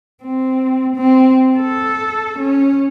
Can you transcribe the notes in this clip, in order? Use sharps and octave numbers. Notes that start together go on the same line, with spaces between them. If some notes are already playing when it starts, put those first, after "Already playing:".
C4
C4
A4
C#4